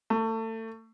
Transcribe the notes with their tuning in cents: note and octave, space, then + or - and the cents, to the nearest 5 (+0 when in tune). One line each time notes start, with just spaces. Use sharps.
A3 +30